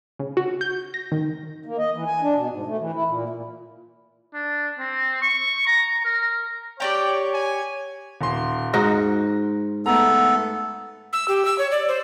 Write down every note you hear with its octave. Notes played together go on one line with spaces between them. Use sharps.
C#3
F#4
G6
A#6
D#3
A#3
D#5
E3
G#5
D4
B2
G#2
A3
E3
E4
A#2
A#2
D4
C4
C#6
A#5
A#4
G4 C#5 D5 G5 A#5
G#5
D#1 C6
G#2 D#4 F#4 A#6
A3 B3 A4 A#5
E6
G4
E6
C#5
D5
C5